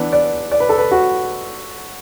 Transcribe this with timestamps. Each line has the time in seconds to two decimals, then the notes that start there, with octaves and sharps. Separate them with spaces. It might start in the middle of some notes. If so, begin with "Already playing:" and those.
Already playing: E3 B3 D4
0.12 D5
0.51 D5
0.60 B4
0.69 A4
0.78 B4
0.91 F#4